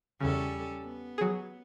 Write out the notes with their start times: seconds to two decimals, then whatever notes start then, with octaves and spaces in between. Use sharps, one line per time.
0.20 E2 C#3 G3 C#4 A4
0.83 B3
1.18 F#3 G#4